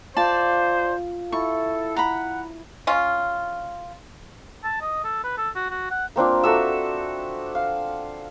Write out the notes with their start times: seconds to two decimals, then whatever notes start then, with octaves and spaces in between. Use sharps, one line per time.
0.17 F4 C5 D5 F5 A5
1.32 E4 A4 C#6
1.96 F#5 A#5 B5
2.87 C#4 F4
4.64 A5
4.81 D#5
5.04 A4
5.24 B4
5.38 A4
5.55 F#4
5.70 F#4
5.91 F#5
6.16 A#3 C4 D4 F4
6.43 F#4 A4 E5 E6
7.55 F5